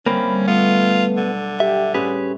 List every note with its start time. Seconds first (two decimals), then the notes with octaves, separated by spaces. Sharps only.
0.06 D2 G3 A#3 C4 C#4 B5
0.48 A3 B3 F4 B4
1.17 B1 D3
1.60 G4 E5
1.94 A2 A3 C4 C#4 G4 G#4 B4